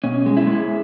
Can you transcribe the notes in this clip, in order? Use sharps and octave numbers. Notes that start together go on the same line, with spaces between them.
B2 C#4
G#3
E4
G#3